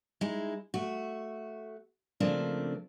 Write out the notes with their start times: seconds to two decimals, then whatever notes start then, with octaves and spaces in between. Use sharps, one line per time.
0.21 G#3 D#4 E4
0.74 A3 F#4
2.20 C#3 F3 A3 A#3 C4 D4